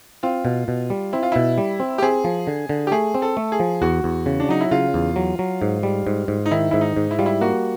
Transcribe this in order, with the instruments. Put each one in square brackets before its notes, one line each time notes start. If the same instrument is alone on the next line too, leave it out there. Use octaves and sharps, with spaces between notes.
[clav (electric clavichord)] C4 [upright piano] F4
[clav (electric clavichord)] B2
B2
G3
[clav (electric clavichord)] C4 [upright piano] E4
[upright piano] F4
[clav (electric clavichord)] B2 [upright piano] E4
[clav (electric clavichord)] G3
C4
[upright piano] G4
[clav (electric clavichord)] C4 [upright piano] G#4
[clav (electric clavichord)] F3
D3
D3
[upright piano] G4
[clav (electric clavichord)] A3 [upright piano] G#4
[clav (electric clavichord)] C4
[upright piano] A4
[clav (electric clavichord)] A3
[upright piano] G#4
[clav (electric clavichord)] F3
[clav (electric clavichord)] E2 [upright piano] F#4
[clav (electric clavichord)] E2
C#3
[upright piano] D4
[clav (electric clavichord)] F#3 [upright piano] D#4
[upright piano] E4
[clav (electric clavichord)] C#3 [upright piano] F4
[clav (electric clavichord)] E2
F#3
F#3
G#2
G3
G#2
G#2
[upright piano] D#4
[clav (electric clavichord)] D#3 [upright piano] E4
[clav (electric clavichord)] G#2 [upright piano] E4
[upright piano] D#4
[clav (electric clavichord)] G#2
[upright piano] E4
[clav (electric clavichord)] G3 [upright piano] F4
[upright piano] E4
[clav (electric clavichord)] A#3 [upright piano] F#4